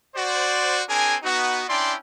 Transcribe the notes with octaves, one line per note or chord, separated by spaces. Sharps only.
F#4 C5 D5
C4 D4 G#4 A#4 G#5
B3 D#4 F#4
C#4 D4 E4 D5 G5 C6